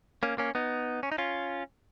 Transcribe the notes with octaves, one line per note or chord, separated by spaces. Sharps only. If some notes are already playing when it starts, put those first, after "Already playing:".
A#3 C#4
A#3 C#4
B3 D#4
C#4
D#4
C#4 F4